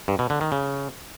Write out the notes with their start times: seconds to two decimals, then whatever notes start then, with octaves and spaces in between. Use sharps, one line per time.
0.08 G2
0.19 B2
0.30 D3
0.41 D#3
0.52 C#3